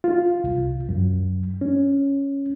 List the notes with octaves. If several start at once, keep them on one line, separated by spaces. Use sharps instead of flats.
F4
C2
F#2
C#4